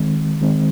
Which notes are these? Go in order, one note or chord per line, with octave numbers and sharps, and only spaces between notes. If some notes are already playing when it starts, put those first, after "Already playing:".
Already playing: D#3 G#3 C4
D#3 G#3 C4